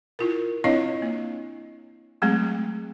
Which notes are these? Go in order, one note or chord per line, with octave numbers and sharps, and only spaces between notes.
E4 F4 A#4
C4 D4 E4 C#5 D#5 F5
A#3
F#3 G#3 A3 C4 G#4